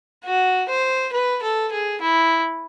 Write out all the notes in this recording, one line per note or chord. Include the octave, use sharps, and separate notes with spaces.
F#4
C5
B4
A4
G#4
E4